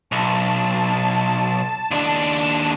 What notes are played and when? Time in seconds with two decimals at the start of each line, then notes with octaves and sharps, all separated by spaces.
0.12 B1 A5
1.91 D#2 D4